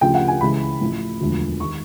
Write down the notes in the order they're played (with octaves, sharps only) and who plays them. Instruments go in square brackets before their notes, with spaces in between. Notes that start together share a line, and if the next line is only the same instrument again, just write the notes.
[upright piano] D2 C#3 F3 G5
F#5
G#5
C#2 C#3 E3 B5
A1 A2 F3
E1 D2 D3 F3
D#3 C#6